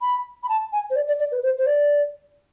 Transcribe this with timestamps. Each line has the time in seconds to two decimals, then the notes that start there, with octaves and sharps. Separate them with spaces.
0.01 B5
0.43 B5
0.49 A5
0.73 G#5
0.90 C5
0.96 D5
1.08 D5
1.19 D5
1.32 B4
1.43 C5
1.58 C5
1.66 D5